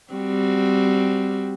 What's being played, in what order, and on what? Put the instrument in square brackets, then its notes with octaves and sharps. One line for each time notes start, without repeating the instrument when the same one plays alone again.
[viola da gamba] G3 C4 F#4